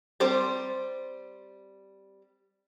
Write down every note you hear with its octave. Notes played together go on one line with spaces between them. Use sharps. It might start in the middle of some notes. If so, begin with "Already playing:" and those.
G3 C4 C5 D5 A5